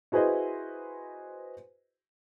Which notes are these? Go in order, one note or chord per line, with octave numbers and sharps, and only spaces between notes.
E4 F#4 G#4 B4 C5 D#5